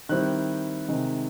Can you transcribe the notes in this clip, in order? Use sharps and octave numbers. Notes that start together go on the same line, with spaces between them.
D#3 G3 C4 E4 F#6
C3 D#3 G#3